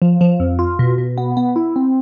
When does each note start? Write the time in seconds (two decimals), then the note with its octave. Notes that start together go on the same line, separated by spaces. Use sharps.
0.02 F3
0.21 F3
0.40 F2
0.59 F4
0.79 B2
0.98 B2
1.18 B3
1.37 B3
1.56 E4
1.76 C4